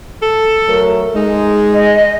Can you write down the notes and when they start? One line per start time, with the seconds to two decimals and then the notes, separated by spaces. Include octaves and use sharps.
0.22 A4
0.69 F#3 A3 A#4
1.16 G#3 D#4
1.73 D#5